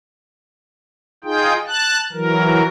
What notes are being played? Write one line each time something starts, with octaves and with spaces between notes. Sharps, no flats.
D#4 F4 G#4 G5
A5 F#6
E3 F#3 A#4